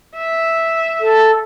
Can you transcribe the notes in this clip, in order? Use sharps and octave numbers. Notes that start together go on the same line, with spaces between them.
E5
A4